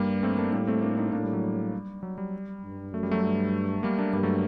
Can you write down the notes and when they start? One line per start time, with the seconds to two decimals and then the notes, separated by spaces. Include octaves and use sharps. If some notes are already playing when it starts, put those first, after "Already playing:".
Already playing: G2 G3 A#3
0.23 A3 C4
0.37 A#3 D4
0.53 A2 G3 A#3
0.67 A3 C4
0.82 A#3 D4
0.98 C4 D#4
1.13 A2 A#3 D4
1.23 G3
1.33 F#3
1.44 G3
2.03 F#3
2.18 G3
2.64 G2
2.93 F#2 A3
3.03 G3
3.11 F#3 A3
3.24 G2
3.83 G3 A#3
3.98 A#3 D4
4.13 G2 G3 A#3
4.23 F#3 A3